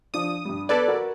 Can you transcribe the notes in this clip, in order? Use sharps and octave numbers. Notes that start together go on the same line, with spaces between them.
F3 D4 D#6
G2 G3
B3 A4 B4 D5 G#6
F#4 A#4